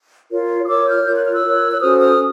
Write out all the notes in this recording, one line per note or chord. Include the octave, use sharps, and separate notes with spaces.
F4 A#4 C#5
D#6
F4 A#4 C#5 D6 E6
F6 G6
F4 A#4 C#5 G6
F#6
F6
E6 F#6
F4 A#4 C#5
F#6
C#4 F#4 A4 C5 D#6 F6
D#6 F6